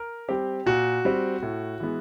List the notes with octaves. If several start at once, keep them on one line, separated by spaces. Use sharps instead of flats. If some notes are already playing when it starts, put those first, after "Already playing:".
Already playing: A#4
G3 C4 G4
A#2 F#4
G3 C4
A2
E3 G#3 B3